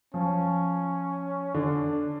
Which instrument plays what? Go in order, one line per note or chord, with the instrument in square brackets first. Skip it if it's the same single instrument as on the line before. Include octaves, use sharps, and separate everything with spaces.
[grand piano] F3 [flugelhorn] C#4
[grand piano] D3 [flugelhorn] D4